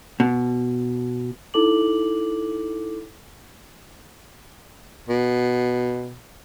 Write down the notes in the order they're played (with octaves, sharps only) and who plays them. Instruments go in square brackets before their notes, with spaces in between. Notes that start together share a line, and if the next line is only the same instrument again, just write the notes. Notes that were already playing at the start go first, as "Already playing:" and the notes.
[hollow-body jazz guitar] B2
[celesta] D#4 E4 A4 D6 F#7
[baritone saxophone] B2